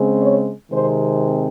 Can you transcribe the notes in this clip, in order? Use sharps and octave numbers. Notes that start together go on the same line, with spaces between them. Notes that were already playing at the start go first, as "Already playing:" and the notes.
Already playing: C#3 G#3 C4
C#5
C3 D#3 G#3 C4 C5